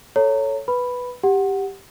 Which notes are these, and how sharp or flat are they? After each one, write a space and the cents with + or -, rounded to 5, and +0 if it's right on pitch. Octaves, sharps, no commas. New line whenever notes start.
A4 +0 C#5 +0 A#5 -25
B4 +0 B5 +0
G4 +5 F#5 +0